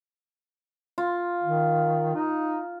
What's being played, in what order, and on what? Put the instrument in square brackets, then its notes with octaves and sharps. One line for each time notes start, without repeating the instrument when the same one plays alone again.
[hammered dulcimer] F4
[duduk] D#3
D#4